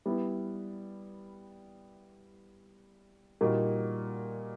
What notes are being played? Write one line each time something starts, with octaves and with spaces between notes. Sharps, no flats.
G3 B3 E4
A#2 G3 A#3 D#4 F#4